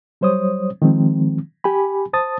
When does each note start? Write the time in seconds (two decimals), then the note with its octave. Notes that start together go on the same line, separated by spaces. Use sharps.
0.21 F#3 G3 C5 C#5 D#6
0.82 D#3 F3 G#3 C4
1.64 G4 G#5 B5
2.13 C5 A5 D#6 A6